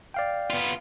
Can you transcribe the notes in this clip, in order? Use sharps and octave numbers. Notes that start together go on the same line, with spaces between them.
D5 F5 G5
B3 F4